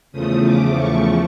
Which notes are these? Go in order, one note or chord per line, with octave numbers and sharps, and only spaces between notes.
E2 C#3 F3 A3 D#6
D6
C#6